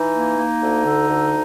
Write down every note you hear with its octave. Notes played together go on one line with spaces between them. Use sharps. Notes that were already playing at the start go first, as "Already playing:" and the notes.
Already playing: E3 D#4
A#3
A#3
D2
D3
D2